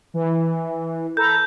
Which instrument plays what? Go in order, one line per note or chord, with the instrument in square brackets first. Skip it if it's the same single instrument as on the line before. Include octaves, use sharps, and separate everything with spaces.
[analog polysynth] E3
[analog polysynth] A4 A#5 B5 [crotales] G6